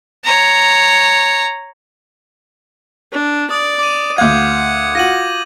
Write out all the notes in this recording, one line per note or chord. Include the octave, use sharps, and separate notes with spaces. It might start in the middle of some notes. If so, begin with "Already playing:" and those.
C#5 A#5
D4
D5 D#6
D6 D#7
D2 F5 F#5 D6 G6 G#6
F4 F#4 A#6 D#7 F#7